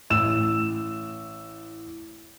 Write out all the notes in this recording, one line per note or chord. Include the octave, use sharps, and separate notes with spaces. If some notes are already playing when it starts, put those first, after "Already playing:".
A1 E6 E7